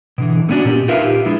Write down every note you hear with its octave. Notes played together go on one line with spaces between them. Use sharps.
B2 D3 E3
A3 B3 C#4 D4 F#4
A#2 G4
D#4 F4 A#4 B4 E5 F5
G4
F3 G#3 D4 E4 F4